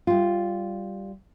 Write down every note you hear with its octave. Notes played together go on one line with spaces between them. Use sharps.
G3 F4